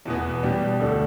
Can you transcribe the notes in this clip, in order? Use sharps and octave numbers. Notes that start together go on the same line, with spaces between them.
E2 B2 B3
B2 G3 D4 G4
D2 D3 A3 D4 A4